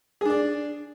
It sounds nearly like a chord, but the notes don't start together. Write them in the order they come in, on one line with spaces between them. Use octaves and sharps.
G#4 D4 D5